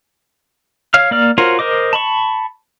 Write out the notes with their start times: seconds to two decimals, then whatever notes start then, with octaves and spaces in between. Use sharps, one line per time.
0.94 C#5 F5 F6
1.11 A#3 D5 F6
1.38 F4 F#4 A#4 C5 C#5
1.59 A#4 C5 D#5 D6
1.93 A5 B5 C#6